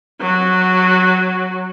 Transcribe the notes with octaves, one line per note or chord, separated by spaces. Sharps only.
F#3 F#4